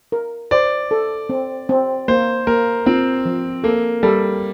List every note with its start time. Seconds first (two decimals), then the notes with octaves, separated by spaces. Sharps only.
0.12 A#4
0.51 C5 D5
0.91 A4
1.29 C4
1.69 C4
2.08 A#3 C5
2.47 A#3 A#4
2.86 C4 F4
3.25 F3
3.64 A#3 A4
4.03 G3 A4